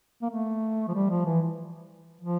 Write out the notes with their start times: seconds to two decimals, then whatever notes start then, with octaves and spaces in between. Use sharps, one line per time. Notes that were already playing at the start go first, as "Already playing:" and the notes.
0.22 A#3
0.30 A3
0.88 F3
0.95 G3
1.10 F3
1.25 E3
2.21 F3